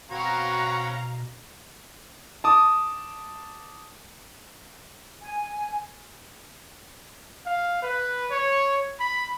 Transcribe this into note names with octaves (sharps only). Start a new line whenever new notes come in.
B2 C4 F#4 B4 C#5 F5 A#5
A5 D6 D#6
G#5
F5
B4
C#5
B5